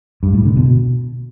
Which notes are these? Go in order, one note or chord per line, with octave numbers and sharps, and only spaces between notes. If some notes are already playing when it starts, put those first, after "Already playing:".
G2
A2
D3
B2